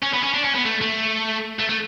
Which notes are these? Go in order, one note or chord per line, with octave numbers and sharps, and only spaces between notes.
C#4
B3
C#4
D4
C#4
B3
A3
A3
A3
A3